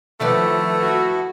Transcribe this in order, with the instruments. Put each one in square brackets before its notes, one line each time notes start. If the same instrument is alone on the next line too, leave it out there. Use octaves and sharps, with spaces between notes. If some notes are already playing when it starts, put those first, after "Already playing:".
[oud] D#3 B4 D5 [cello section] F3 [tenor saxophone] A3 [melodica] B3 E4 A4
[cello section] F#4